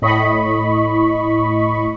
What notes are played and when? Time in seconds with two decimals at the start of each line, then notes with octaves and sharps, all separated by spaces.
0.02 A2 D#5 B5 C#6